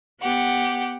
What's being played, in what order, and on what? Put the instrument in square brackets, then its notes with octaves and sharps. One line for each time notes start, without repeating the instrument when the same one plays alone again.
[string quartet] B3 G4 F#5